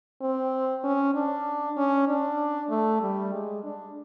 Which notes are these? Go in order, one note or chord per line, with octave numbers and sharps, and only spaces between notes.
C4
C#4
D4
C#4
D4
A3
G3
G#3
D4